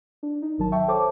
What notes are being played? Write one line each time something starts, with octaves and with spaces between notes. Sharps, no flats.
D4
D#4
G#1 D#3 F#3 A5
E5 G5 A5 C#6
A4 C5 C#5 A5 D6